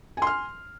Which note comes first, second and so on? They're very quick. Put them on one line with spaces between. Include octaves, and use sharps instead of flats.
G#5 C6 F6